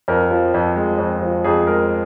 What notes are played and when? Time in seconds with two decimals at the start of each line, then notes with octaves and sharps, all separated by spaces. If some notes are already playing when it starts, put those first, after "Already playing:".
0.08 F2 A#4
0.31 F3
0.54 F2
0.76 G#3
0.99 F2
1.22 F3
1.44 F2 G#4
1.67 G#3 A#4